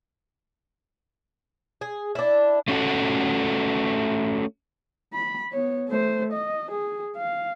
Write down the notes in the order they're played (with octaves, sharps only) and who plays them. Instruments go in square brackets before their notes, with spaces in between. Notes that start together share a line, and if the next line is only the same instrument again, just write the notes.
[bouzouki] G#4
D4 E4
[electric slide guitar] A3 C#4 F#4 A4 F#5
[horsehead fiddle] B5
B3 C#5
A3 C5
D#5
G#4
F5